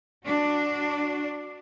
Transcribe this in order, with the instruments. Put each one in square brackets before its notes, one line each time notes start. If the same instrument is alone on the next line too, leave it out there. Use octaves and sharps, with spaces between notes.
[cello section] D4 F#4